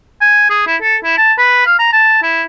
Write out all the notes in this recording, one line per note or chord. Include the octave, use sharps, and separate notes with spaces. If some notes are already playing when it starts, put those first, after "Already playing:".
G#5
G#4
E4
A4
E4
A5
B4
F5
A#5
A5
E4